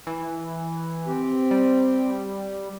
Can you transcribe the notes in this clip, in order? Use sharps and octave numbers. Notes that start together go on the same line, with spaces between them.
E3
C4 G4
G3